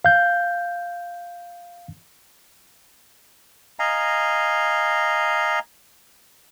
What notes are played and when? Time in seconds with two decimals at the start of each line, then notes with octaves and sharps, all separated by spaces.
0.05 F5 G6
3.79 D#5 F5 G#5 A#5